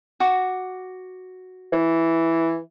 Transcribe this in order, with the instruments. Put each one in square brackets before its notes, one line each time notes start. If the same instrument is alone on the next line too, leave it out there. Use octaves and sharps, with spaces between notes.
[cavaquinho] F#4 D6
[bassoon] E3